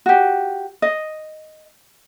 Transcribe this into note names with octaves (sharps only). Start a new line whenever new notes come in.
F#4 G4
D#5